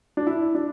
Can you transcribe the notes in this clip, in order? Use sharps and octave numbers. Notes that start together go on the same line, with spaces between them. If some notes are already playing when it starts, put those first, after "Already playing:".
D4
E4
D4